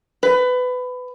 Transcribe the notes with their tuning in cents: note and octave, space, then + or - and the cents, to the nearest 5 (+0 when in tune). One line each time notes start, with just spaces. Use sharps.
B4 +20